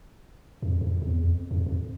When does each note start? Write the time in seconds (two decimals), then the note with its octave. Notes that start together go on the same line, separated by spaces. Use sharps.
0.62 F2
0.81 F2
1.02 E2
1.21 F2
1.51 F2
1.66 F2